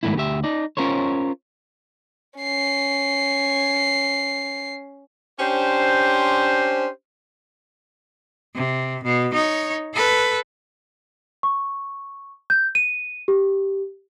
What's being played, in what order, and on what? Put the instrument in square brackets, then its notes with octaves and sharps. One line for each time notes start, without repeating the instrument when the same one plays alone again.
[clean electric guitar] G#2 D#3 A3 B3 E4
D2 G4 E5
D#4 D5
C#4 F4 A#4 C5 C#5
[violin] C#4 C7
[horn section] C#4 D4 G4 C5
[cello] C3
B2
D#4 C#5
A4 B4
[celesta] C#6
G6
D#7
G4